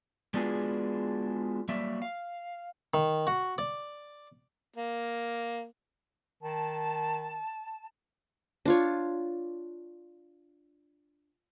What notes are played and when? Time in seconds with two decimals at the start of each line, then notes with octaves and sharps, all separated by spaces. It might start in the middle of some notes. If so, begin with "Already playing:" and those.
0.34 G#3 B3 D4 F4 F#4 G#4
1.69 F#3 G3 A#3 D5 E5
2.02 F5
2.94 D#3
3.27 F#4
3.58 D5
4.76 A#3
6.43 D#3 A5
8.65 D4 F4 C#5